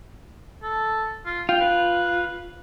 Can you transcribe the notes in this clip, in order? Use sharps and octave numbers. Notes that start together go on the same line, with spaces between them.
A4
F4
F4 G5
B4